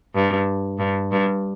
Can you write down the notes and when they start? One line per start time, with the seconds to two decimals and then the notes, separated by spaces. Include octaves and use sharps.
0.15 G2
0.79 G2
1.12 G2